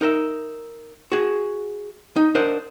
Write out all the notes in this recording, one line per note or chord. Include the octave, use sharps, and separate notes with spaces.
D#4 A#4 D#5 E5
F#4 G#4
D#4
D4 A#4 C5 D#5 F#5